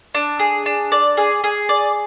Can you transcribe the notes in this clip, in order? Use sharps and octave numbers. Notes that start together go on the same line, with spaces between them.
D4
G#4
D4
D5
G#4
G#4
D5